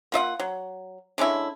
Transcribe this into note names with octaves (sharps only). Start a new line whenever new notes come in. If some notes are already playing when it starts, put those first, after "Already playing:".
A#3 F4 D#5 F#5
F#3
D3 G#3 C#4 E4